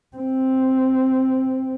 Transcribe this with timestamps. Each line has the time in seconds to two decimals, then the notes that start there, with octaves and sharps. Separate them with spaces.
0.17 C4